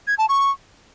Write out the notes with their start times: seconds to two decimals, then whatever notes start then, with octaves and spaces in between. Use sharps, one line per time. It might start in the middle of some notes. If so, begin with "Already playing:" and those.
0.07 G#6
0.18 A5
0.29 C#6